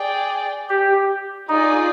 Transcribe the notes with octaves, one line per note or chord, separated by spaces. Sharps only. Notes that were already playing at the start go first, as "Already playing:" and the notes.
Already playing: G#4 D5 G5
G4
D#4 F4 G#4 D5